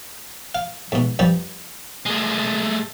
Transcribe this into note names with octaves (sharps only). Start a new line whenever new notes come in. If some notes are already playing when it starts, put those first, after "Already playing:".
F5
G#2 B2
G2 F3 G3
G#3 A3